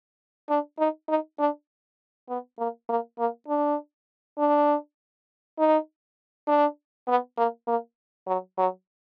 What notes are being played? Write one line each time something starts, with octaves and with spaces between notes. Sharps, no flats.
D4
D#4
D#4
D4
B3
A#3
A#3
A#3
D4
D4
D#4
D4
B3
A#3
A#3
F#3
F#3